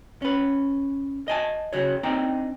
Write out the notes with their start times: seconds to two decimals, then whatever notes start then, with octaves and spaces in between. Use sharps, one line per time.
0.22 C#4 B4
1.28 D#5 G#5 A5
1.73 C#3 F#4 C#5
2.03 C4 D4 D#4 G5 A#5